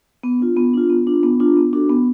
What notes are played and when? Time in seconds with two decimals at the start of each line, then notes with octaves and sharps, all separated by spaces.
0.23 B3
0.40 D4 F4
0.57 B3
0.73 D4 F4
0.90 B3
1.07 D4 F4
1.23 B3
1.40 D4 F4
1.57 B3
1.73 D4 F#4 A4
1.90 B3